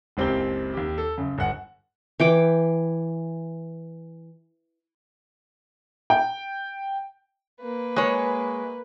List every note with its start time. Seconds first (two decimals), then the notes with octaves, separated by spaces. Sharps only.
0.17 F#1 C#2 C4 G4 A#4 G7
0.74 D#2 G4
0.98 A4
1.18 F#2 C#3
1.38 G1 F#5
2.20 E3 G5 D6
6.10 G5
7.61 A#3 B4
7.96 G#3 C#5